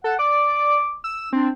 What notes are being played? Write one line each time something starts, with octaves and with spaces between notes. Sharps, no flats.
A4 F#5
D5 D6
E6
C4 D4